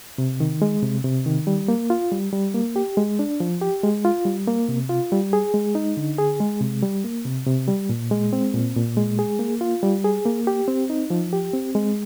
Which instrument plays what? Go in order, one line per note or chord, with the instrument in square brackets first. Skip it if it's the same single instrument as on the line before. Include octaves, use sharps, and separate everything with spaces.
[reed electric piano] C3
D#3
G#3
C3
C3
D#3
G3
A#3
F4
G3
G3
A#3
G4
G#3
D4
F3
G4
G#3
F4
G3
A#3
C3
F4
G3
G#4
G#3
D#4
D3
G#4
G#3
C3
G3
A#3
C3
C3
G3
A#2
G#3
C4
A#2
A#2
G#3
G#4
A#3
F4
G3
G#4
A#3
G4
C4
D#4
F3
G4
C4
G#3